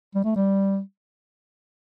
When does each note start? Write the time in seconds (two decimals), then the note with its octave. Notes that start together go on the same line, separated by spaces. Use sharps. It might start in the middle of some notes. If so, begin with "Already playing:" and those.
0.15 G3
0.25 A3
0.36 G3